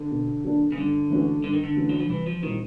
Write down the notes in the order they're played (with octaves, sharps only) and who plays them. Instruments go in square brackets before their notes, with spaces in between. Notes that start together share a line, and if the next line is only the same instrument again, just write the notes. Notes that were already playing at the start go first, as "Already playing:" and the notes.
Already playing: [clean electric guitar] D3
[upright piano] B2
F#3 A#3 D4 F#4
[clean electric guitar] C#3
[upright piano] G2 [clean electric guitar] D3
[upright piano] E3 A3 C#4 F#4
[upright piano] G2 [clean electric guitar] D3
[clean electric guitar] D#3
D3
[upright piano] E3 A3 C#4 F#4
[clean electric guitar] F#3
F3
[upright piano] C2 [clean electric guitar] E3
[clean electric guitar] F3
[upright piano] A#2 G3 C4 E4 [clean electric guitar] D#3